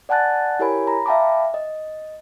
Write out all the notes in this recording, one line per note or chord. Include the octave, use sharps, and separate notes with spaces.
D5 F#5 G#5 A5 F#6 A6
E4 G4 A#4 C#5 G#5 B5
A#5 B5
E5 F5 G5 A5 B5 D6
D#5